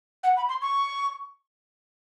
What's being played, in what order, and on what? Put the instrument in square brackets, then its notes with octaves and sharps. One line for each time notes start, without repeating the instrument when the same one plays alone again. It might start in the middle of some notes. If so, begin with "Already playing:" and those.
[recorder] F#5
B5
C6
C#6